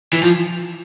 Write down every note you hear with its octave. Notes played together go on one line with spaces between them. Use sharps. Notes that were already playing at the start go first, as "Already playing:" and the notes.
E3
F3